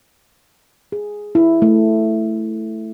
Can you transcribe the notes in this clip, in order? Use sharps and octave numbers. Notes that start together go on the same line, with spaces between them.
G#4
E4
A3